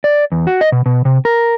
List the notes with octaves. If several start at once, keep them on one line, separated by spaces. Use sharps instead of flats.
D5
E2
F#4
D#5
B2
B2
C3
A#4